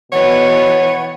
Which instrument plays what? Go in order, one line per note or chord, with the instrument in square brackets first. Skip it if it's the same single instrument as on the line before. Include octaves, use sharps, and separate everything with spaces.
[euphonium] B2 [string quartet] E3 B3 B4 [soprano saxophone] C#5 [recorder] F#5